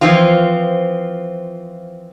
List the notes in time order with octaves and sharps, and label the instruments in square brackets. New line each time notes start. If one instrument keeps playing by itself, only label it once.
[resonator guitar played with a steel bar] E3 F3 C4 F4